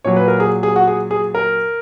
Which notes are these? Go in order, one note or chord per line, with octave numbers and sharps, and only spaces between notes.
A#2 F#3 C#5
B4
A#4
G#4
G#4
F#4
G#4
G#4
A#4